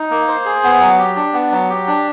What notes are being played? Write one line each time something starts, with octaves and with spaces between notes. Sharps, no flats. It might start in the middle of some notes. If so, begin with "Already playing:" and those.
Already playing: D#4
A#3
C5
G#4
B3
F#3
G4
D4
B3
F#3
G4
D4